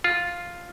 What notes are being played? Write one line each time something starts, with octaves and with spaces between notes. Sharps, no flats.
F4